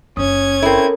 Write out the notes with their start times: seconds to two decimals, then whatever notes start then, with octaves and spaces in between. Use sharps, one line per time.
0.17 F#1 C#4 D4 D#6 G#6
0.63 C4 E4 A4 A#4